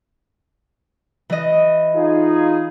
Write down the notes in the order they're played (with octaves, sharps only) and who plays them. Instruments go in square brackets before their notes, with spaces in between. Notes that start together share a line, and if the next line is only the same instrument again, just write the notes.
[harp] E3 D#5
[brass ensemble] D#4 F4 G#4